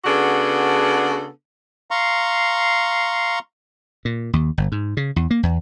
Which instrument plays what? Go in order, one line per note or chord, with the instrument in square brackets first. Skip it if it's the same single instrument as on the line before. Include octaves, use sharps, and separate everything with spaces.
[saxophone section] C#3 B3 D4 F#4 G#4 A4
[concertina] F5 A#5 C6 C#6
[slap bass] A#2
D#2
G1
G#2
C#3
E2
A#3
E2